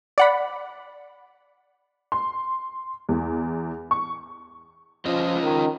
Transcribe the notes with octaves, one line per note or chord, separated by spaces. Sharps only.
D5 F#5 B5
C6
E2
C#6
F3 C#4 F4 D#5
D#3